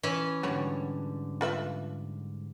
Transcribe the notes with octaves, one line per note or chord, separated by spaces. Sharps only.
E3 C#4
G#2 D3 G3 F#4 C#5
F4 B4 E5